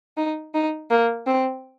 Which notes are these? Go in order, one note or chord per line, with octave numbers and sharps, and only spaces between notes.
D#4
D#4
A#3
C4